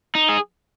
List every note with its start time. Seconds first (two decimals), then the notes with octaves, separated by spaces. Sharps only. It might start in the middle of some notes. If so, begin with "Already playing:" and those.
0.15 D#4
0.29 G#4